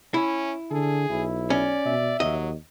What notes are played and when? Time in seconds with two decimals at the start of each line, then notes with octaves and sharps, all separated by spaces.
0.14 C#4 E4
0.71 D3 G#4 A4
1.10 B1 E4
1.50 C#4 D5
1.85 B2 E5
2.20 D#2 F#3 D#5